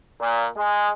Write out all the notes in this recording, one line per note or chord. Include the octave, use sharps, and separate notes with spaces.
A#2
G#3